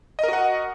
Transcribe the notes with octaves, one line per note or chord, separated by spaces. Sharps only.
F#4 A#4 D#5 F#5